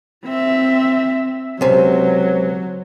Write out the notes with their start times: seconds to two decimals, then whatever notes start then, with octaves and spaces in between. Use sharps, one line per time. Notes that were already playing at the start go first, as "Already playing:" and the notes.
0.25 C4 E5
1.61 C#2 C3 F#3